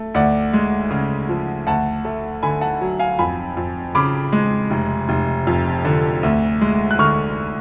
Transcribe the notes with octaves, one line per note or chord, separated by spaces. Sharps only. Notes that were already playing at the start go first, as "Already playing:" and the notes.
Already playing: A3
D2 D5 F#5
G#3
C#3
F3
D2 F#5 A5
A3
D3 G#5 B5
F#5 A5
F#3
F5 G#5
F2 G#5 B5
F2
C#3 B5 D6
G#3
F1
F1
F2
D3
D2
G#3
F#6
D3 C#6 F6